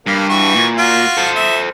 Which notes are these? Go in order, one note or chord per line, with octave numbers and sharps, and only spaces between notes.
G2 A#3
E3 F#4 C#6
A#2
F4 F#4
A4 C5
E5